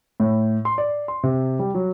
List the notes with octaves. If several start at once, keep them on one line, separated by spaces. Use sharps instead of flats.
A2
C6
D5
C6
C3
G3
F#3